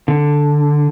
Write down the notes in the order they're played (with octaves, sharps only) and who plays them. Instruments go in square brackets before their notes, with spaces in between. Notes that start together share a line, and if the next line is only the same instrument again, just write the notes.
[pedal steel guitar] D3